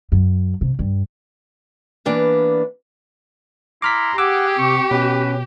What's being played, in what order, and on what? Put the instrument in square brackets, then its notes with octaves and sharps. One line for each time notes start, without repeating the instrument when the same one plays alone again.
[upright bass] F#2
C3
G2
[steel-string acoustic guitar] E3 A#3 B3 D4 B4 F5
[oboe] E4 [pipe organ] A#5 C6 [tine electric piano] D6 F6 B6
[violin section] G4 [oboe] G#4 [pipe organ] F#5 [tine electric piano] D6 E6
[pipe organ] C3 [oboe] C#6
[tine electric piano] B2 [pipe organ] C#4 [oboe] B4